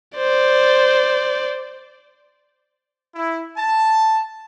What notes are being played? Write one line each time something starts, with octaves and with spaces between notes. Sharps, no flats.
C5 D5
E4
A5